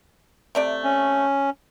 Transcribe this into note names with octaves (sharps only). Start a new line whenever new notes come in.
C3 A3 D5
C#4